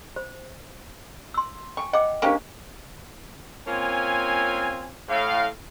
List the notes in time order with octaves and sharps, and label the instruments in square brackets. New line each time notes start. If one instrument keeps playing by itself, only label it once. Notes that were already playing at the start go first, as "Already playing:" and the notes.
[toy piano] C5
C6 E6
[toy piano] G5 G#5 [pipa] C#6
[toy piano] D#5 G5 D6 [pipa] F#5
[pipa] A#3 C#4 G4 [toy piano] D4 C5 G#5
[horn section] A#3 C4 C#4 F4 G#5
A2 F5